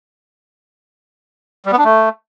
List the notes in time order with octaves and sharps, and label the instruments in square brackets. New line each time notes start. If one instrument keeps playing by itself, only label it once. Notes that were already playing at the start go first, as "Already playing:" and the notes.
[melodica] G3
B3
D4
A3